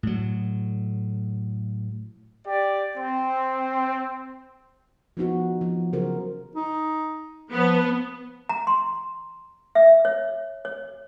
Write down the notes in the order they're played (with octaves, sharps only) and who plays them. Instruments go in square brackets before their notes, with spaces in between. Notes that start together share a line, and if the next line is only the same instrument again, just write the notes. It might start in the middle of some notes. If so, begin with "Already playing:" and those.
[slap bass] A2 F#3
[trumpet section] G4 D5
C4
[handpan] F3 B3 D#4 F#4
F3
C#3 F#3 F#4 A#4 C5
[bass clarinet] D#4
[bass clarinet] F3 [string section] B3
[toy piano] A#5
C6
E5
C#5
C#5